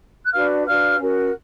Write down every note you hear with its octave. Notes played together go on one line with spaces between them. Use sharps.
F#6
D4 F#4 B4 F5 F6
D4 F#4 B4 F5 F6
C#4 F#4 A#4